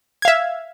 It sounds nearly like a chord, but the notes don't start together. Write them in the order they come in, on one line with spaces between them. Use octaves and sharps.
G#6 F5 E5